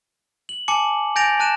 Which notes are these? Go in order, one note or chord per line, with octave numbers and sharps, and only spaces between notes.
F#7
G#5 A5 D6 C#7 F#7
G#5 G6 A6 A#6 D7 F7
A5 F#6 D#7 E7